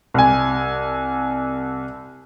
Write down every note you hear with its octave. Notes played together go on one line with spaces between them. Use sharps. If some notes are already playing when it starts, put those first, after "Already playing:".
C2 G#5